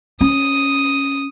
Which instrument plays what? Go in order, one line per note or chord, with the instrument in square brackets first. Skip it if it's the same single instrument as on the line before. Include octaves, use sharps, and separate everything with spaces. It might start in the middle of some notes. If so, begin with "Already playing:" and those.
[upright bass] C#4 [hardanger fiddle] D#6